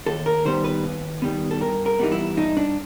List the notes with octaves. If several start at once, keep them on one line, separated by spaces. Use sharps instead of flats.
D#2 A4
A#4
D#3 G3 B3 C5
B4
D#2
D#3 G3 B3
A4
G2 A#4
A#4
E3 G3 B3 D#4
E4
G2 D#4
D4